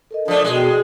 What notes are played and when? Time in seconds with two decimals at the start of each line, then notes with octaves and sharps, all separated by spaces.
0.11 A4 A#4 D#5
0.28 F3 A3 D4
0.44 B2 G#3
0.56 G5